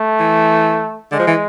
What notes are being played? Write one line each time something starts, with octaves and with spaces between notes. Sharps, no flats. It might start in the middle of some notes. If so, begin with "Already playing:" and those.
Already playing: A3
E3
D3 G#3
F3
E3